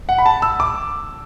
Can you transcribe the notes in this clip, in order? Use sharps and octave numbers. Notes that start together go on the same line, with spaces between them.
F#5
B5
A5
E6
D6